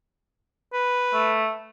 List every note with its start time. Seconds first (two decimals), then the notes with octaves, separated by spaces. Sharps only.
0.73 B4
1.14 A3